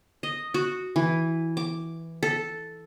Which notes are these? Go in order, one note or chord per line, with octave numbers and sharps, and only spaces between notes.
D#5
F#4
E3
D6
A4